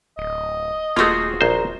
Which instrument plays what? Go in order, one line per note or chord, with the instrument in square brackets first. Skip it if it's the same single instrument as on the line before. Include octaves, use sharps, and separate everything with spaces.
[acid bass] D1 [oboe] D#5
[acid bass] D#1 [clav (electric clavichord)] A3 A#3 [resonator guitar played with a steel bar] F4 F#4 G#4
[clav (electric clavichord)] A#1 C5 [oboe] A#5